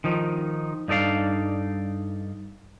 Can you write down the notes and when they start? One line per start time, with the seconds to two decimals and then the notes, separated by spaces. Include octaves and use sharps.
0.04 D#3 F3 D#4
0.88 G2 D#4 A4 D5 F5